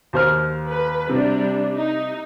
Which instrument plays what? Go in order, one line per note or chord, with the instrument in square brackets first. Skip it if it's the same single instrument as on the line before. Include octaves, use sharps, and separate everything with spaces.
[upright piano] D#2 C5 F6
[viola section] B4
[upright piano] C3 [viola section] G3 D4
[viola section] D#4